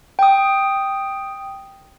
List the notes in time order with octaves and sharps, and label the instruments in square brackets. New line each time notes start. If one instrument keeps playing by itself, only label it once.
[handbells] G5 D#6